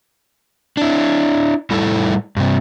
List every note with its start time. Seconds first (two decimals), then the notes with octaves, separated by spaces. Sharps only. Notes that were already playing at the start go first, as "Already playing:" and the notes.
0.77 D4 E4
1.71 A2 G3 E4 A4
2.36 G2 C3